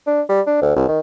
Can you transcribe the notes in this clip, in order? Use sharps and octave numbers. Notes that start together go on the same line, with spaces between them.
D4
G3
D4
D2
C2
D#3